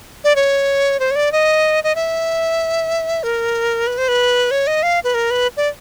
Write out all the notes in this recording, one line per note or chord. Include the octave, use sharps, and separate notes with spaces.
D5
C#5
C5
C#5
D5
D#5
D#5
E5
A#4
B4
C5
B4
C#5
D#5
F5
B4
A#4
B4
D5